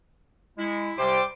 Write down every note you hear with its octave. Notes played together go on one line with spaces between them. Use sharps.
G#3 E4
C2 C3 G3 C5 G5 D6